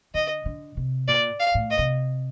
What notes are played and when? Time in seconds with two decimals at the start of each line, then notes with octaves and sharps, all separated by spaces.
0.14 D3 D#5
0.45 D3
0.77 C3
1.08 A#2 D5
1.40 F5
1.55 A2
1.71 D#5
1.79 C3